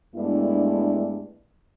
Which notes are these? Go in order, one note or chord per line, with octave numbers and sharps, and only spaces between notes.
G2 G#3 A3 B3 D4 E4